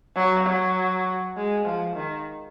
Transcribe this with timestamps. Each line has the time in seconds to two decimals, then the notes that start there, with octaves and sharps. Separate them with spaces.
0.16 F#3
0.46 F#3
1.36 G#3
1.66 F3
1.96 D#3